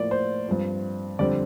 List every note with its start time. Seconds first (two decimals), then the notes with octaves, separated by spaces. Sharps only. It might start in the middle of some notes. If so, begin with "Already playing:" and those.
Already playing: A2 F3 A#3 D5
0.11 C5
0.48 G2 F3 C4
1.19 F2 D3 G3 C4 D5